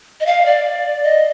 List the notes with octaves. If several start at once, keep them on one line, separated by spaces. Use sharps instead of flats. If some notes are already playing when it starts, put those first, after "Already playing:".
D#5
F5
D5
D#5